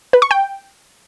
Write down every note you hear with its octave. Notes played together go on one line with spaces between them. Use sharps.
B4
C#6
G5